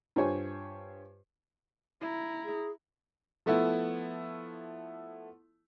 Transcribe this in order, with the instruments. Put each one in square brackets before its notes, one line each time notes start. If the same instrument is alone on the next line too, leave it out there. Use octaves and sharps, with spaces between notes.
[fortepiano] G2 F4 C5 C#5 G#5
[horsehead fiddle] E4 A#5
[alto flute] G#4
[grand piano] F3 A3 B3 E4